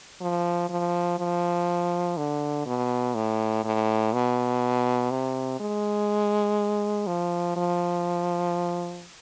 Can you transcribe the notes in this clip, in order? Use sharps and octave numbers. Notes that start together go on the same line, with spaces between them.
F3
F3
F3
D3
B2
A2
A2
B2
C3
G#3
F3
F3